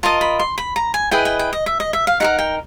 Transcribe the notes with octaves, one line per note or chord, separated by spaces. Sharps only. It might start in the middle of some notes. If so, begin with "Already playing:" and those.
F4 A#4 D#5 A5
B5
C6
B5
A#5
G#5
E4 G#4 B4 D#5 G5
G5
G5
D#5
E5
D#5
E5
F5
D#4 G4 A#4 F#5
G5